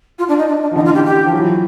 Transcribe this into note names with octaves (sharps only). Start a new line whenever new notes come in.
F4
D4
D#4
D4
D4
F3
D3 E3 D#4
F4
G4
G4
F3
E3 F#3